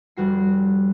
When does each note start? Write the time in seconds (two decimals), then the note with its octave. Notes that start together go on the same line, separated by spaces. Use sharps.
0.17 F1 G3 F#4 C7